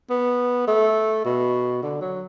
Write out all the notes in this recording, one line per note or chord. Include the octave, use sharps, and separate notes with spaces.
B3
A3
B2
D3
F#3